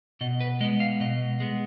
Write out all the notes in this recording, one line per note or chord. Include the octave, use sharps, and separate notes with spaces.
B2 D#5
B4
G#3 B3 D#5
F5
B2 D#5
G#3 B3